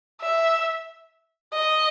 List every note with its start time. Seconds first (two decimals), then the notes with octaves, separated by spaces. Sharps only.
0.22 E5
1.53 D#5